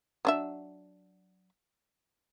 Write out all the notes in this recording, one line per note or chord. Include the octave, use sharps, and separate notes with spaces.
F#3 D4 E5